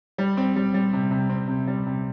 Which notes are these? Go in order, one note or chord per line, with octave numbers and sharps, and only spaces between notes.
G3
C4
G3
G3
C3
C3
C4
C3
G3
C3